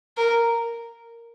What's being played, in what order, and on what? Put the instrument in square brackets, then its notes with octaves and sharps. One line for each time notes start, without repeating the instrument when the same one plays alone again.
[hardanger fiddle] A#4